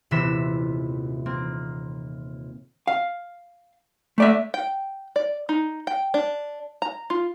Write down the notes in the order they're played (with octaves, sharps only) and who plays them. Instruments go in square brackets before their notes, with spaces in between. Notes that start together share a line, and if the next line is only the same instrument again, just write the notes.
[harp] D#1 C3 E3 B3 B6 E7
A#3 C4
[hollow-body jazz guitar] F5
A3 D5 E5
[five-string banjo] G5
D5
D#4
G5
D4
A#5
F4